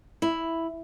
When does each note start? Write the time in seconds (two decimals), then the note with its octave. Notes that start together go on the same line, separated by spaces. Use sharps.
0.22 E4